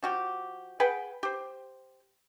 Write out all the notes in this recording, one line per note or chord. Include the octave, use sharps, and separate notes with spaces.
F3 F#4 G4
G#4 B4 F#5 G5
G4 C5